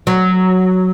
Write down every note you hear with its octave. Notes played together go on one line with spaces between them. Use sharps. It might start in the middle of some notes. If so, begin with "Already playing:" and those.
F#3